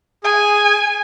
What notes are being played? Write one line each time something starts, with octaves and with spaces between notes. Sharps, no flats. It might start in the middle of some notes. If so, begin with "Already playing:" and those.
G#4 G#5